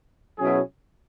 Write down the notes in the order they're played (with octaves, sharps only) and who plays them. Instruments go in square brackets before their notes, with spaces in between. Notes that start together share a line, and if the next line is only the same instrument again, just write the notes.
[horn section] B2 F#3 C#4 E4 G#4